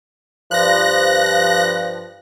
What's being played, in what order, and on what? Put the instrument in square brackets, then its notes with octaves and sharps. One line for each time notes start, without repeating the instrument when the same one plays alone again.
[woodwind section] G2 F3 [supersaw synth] F#6 A#6